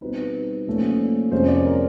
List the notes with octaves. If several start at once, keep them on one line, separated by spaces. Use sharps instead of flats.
B2 G3 C4 D#4 B4
A#2 F3 A3 C#4
F2 C3 F3 G#3 C#4 C5
D5
A#4